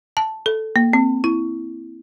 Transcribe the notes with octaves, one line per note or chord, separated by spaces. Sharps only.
A5
A4
A#3
C4
E4